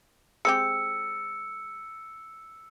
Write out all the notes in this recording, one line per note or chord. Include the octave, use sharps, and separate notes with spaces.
G#3 C4 G4 E6 C#7